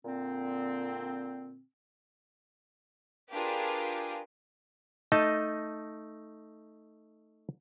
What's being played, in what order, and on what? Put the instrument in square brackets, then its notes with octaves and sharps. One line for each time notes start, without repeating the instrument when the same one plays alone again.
[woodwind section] A#2 D3 C4
[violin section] D4 F4 G4 G#4 A#4 B4
[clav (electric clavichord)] A3 D#4 D#5 A5